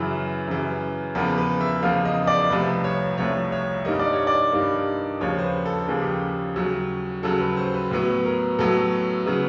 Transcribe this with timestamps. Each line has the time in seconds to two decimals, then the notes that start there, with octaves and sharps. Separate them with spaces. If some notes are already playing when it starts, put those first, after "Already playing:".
Already playing: F#2 C#3 E3 B4
0.48 F#2 C#3 E3
1.15 E2 C#3 F3 A#3 B4
1.38 B4
1.61 E5
1.82 E2 C#3 F3 A#3 F5
2.05 D#5
2.27 D5
2.50 C2 C3 F3 A3 B4
2.84 C#5
3.18 C2 C3 F3 A3 C#5
3.52 C#5
3.85 G2 D#3 G3 A#3 D#5
3.99 D5
4.13 C#5
4.27 D5
4.52 G2 D#3 G3 A#3
5.21 D#2 C#3 F3 A#3 C#5
5.39 C5
5.43 B4
5.65 A4
5.88 D#2 C#3 F3 A#3 G#4
6.02 G4
6.15 G#4
6.56 D#2 C#3 F#3
7.23 D#2 C#3 F#3 A4
7.40 B4
7.57 C5
7.74 B4
7.90 A2 F#3 B3 B4
8.25 A#4
8.59 A2 F#3 B3 A4
9.26 C#3 F#3 B3